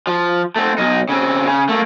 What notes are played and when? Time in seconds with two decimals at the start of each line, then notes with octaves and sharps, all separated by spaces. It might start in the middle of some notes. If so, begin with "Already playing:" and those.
0.07 F3
0.56 A3 C4
0.78 B1 D#4
1.09 C#3 C4
1.47 C#3
1.69 A3 A#3